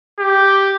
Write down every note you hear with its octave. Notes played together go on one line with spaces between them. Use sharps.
G4